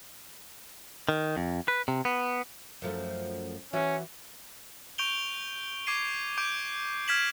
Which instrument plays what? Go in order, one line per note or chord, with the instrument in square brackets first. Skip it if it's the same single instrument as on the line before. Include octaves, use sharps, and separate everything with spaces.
[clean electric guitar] D#3
F2
B4
C3
B3
[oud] F#2 F3 A3
[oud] E3 F#4 E5 [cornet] C#4
[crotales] C#6 G6 D7 F7 G7
D6 G#6 C7 D#7
D6 G6 D7
F6 G#6 B6 E7 F#7